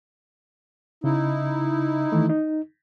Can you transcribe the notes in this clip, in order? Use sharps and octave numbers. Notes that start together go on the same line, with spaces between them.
C#3 D#4 E4
D#3 E3 A3
D#4